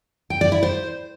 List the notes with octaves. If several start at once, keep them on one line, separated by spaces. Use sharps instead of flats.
G5
D5
E4
C5